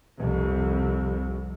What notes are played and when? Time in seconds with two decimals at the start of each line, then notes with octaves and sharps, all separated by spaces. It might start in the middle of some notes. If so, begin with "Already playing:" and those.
0.18 C2 F2